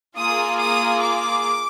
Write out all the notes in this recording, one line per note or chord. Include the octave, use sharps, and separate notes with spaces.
A#3 F4 G#4 D#6
D#6
D6